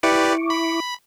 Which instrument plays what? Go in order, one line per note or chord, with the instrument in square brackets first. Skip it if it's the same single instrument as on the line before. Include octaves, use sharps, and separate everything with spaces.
[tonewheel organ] E4 C#6 D6 [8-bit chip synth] G4 B4 D5
[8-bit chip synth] B5